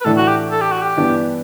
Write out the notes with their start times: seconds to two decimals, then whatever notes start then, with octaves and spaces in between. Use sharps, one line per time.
0.01 B4
0.05 A2 E3 A3 D4 A4
0.17 F#4
0.28 G4
0.51 A4
0.61 G4
0.72 F#4
0.82 G4
0.97 G2 E3 B3 D4